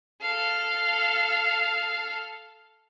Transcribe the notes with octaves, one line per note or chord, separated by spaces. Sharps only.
A4 F5